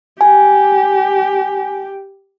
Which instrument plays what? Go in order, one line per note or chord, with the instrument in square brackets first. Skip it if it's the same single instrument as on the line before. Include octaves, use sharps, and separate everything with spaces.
[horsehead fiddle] G4 [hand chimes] G#5